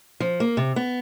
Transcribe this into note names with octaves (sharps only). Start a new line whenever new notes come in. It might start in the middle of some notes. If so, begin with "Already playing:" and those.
F3
A#3
C3
B3